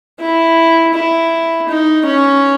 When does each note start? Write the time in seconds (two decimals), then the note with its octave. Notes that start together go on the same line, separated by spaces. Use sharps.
0.20 E4
0.94 E4
1.69 D#4
2.06 C#4